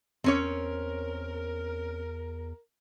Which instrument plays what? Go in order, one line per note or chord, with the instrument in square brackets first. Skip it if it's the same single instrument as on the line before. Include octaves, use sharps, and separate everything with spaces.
[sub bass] E2 [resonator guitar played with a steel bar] C4 C#4 C#5 [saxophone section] A#4